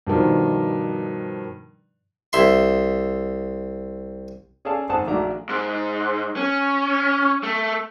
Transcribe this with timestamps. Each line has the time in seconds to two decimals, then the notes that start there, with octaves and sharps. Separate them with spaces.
0.07 G2 B2 D#3 F3
2.33 C2 E5 C6
4.65 C#4 G#4 A4 D5 F5 A5
4.89 G#1 C5 F#5 A5 D#6
5.08 A#1 A3 D4 F#4 A#5
5.49 G#2
6.37 C#4
7.43 A3